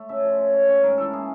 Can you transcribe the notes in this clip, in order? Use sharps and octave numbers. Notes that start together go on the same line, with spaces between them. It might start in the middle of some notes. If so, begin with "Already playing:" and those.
Already playing: A3
C#3 E5
F3
C#3
C#4
C#4
G#2 A#4
E3 A4
A#3 G#4